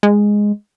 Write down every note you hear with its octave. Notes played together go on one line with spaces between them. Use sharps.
G#3